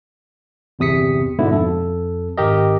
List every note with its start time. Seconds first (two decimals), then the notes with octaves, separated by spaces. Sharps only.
0.79 G1 E2 C3 D#6 B6 C#7
1.39 G#2 B2 D3 E4
1.51 F2 A4
2.37 G#1 G4 A#4 D#5